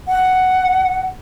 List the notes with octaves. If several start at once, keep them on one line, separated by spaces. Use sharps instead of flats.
F#5